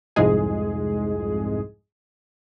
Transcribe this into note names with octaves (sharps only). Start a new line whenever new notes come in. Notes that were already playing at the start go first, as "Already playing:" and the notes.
C2 F2 G#2 G#3 G#4